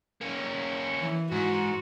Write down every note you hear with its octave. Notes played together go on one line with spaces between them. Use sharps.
A#3 C#4
E3
G#2 F#4